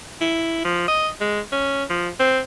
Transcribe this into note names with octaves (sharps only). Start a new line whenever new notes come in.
E4
F3
D#5
G#3
C#4
F3
C4